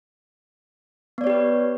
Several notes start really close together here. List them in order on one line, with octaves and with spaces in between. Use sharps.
B3 D5 C#5 G4 B4